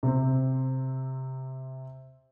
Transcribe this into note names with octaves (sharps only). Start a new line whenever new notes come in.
C3 C4